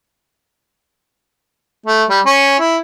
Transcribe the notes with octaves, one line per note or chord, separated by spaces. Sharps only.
A3
G3
C#4
E4